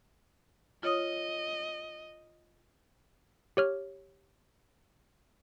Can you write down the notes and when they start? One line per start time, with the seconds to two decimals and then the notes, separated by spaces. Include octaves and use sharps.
0.83 F4 C#5 D#5 D#6
3.57 G4 C#5 F6